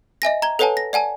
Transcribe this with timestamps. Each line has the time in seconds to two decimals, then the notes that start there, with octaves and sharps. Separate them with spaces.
0.22 D#5 E5 G#5 A#6
0.42 A#5 G#6 G7
0.59 A4 B4 C#5 F#5 G#5 A5
0.77 A#6
0.93 D5 F#5 G#5 A5